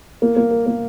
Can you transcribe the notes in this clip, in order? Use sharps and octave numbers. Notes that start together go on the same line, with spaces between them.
A#3
A#3
A#4
A#3